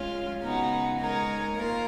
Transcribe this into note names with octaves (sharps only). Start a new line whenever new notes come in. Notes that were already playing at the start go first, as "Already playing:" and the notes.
Already playing: G#3 C#4 F4
C#3 G#3 B3 D#4 F#4
G#3 D#4 A#4 C#5
A#3 F4 A#4